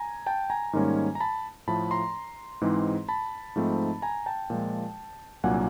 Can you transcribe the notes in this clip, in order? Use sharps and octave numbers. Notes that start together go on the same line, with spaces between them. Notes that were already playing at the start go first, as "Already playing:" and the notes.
Already playing: G#5 A#5
G5 A5
G#5 A#5
G#2 D#3 G3 A#3 C#4
A#5
A5 B5
A2 F3 A3 A5 B5
A#5 C6
G#2 E3 G#3 C4 D#4
A5 B5
G#2 F3 A3 C4 D#4
G#5 A#5
G5 A5
A#2 F3 G#3
C2 A#2 F#3 A#3 D4 F#5 G#5